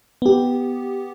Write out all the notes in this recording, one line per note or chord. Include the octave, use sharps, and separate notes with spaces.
B3 G4